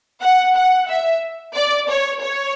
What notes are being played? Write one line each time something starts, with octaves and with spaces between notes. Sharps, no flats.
F#5
F#5
E5
D5
C#5
C#5